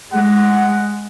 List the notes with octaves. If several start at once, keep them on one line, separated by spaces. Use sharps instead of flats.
G#3 F#5